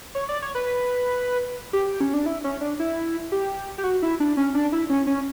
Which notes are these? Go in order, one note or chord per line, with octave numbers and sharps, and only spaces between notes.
C#5
D5
C#5
B4
G4
C#4
D4
E4
C#4
D4
E4
G4
G4
F#4
E4
D4
C#4
D4
E4
C#4
C#4